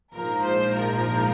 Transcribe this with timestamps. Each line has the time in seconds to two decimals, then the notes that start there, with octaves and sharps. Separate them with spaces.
0.13 A#1 G#2 F3 A#4
0.44 C5
0.74 A#4